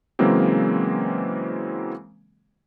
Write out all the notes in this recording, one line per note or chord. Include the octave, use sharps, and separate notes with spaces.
C#3 E3 F#3 G#3 A#3 C4